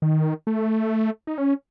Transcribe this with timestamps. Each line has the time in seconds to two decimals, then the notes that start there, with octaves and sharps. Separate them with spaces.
0.02 D#3
0.47 A3
1.27 D#4
1.38 C#4